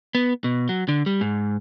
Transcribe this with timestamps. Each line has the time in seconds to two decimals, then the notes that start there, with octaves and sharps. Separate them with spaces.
0.15 B3
0.44 B2
0.69 F#3
0.89 D3
1.06 G3
1.21 G#2